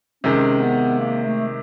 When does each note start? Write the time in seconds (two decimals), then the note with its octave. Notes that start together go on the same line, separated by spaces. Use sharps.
0.24 C3 D#3 G#3 C#4
0.61 B3
0.99 A#3
1.24 A3